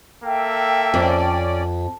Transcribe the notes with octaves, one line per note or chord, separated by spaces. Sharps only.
A#3 A4 E5 G5
F2 C#4 D5